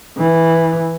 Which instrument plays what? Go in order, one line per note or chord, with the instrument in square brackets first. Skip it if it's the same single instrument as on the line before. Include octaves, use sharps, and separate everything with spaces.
[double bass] E3